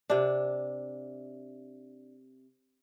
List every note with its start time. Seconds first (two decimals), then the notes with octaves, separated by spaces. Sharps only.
0.10 C3 D4